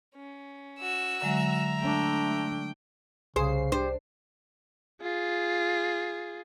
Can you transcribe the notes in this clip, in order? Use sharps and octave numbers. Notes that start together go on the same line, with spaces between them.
C#4
F#4 E6
D3 F#3 G#3 E5 A#5
A3 D4 G5
C2 C#3 G#4 C5 C7
D4 G4 C5
F4 G#4